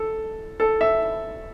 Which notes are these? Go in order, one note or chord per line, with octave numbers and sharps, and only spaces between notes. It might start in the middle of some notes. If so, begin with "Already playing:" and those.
Already playing: A4
A4
E5